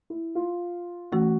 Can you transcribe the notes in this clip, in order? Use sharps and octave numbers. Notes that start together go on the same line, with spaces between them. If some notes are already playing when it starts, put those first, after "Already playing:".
E4
F4
E3 A3 C#4 F#4